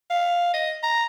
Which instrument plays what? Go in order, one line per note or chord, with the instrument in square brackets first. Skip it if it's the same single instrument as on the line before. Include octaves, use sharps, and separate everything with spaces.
[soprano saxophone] F5
D#5
A#5